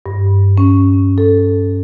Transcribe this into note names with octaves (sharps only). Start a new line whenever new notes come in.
G2
C#4
A4